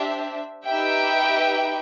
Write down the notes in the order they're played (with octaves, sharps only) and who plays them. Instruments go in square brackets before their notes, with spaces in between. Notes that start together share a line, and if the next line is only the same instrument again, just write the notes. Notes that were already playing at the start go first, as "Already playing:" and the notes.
Already playing: [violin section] D4 G4 C5 E5
D#4 G4 B4 E5 G5